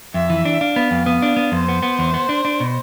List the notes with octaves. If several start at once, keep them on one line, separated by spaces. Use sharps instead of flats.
F2 E5
E3
D4
D4 F5
B3
F2
B3
D4
B3
F2 C5
B3
B3
E2
B3
D4
D4
B2